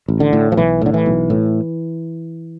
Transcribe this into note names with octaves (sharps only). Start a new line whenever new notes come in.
A1
D3
A2
F3
B1 E3
A2 D3
E3
B1
A2